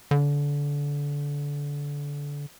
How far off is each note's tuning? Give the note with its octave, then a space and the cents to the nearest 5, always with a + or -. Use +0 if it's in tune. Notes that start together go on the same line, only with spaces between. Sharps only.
D3 -25